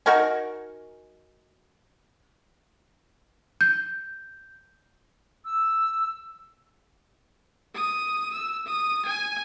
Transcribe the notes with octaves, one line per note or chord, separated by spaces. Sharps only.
D#4 F#4 A#4 G#5
G6
E6
D#6
E6
D#6
G#5